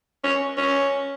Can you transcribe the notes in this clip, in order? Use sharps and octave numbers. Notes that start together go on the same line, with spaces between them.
C#4
C#4